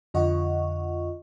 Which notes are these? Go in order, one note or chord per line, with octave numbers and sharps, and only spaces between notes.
F2 D3 F4 D#5 F#5 C#6